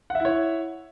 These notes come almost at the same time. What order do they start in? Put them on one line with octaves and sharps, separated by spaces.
F#5 E5 E4 C#5